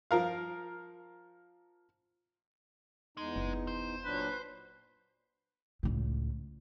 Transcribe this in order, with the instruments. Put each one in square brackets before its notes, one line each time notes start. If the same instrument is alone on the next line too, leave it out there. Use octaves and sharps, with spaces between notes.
[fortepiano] F3 A#4 F5
[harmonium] E2 D#4 [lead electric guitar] G#3
[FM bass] F#1
[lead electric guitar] C5
[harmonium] A#2 F#3 D4 [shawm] B4
[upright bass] C#2 A2